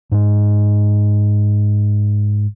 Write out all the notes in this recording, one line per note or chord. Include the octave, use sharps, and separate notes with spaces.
G#2 G#3